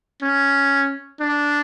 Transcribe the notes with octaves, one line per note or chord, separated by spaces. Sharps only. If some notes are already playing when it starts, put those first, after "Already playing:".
C#4
D4